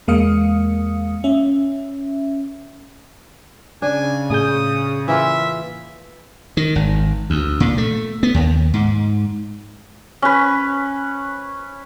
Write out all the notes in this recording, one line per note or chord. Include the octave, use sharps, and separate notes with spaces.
E2 G#3 A#3 F5 D#6 C#7
C#4 E5
C#3 D4 G#5
A2 G#4 D#6 G6
E3 A#3 F4 E5
D#3
G#1
D2
A#2
A3
B3
D#2
G#2
C#4 B4